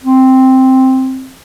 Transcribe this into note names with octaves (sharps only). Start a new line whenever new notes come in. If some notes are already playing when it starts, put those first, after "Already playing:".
C4